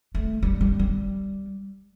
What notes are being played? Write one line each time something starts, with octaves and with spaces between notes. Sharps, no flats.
A3
G3
G3
G3